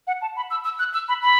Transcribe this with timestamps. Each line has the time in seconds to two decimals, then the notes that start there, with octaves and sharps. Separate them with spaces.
0.07 F#5
0.22 A5
0.36 B5
0.50 E6
0.64 E6
0.79 F#6
0.93 E6
1.09 B5
1.22 B5